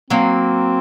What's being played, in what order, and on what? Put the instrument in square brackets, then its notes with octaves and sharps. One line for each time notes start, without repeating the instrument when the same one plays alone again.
[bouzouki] F#3 A#3 [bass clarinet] C4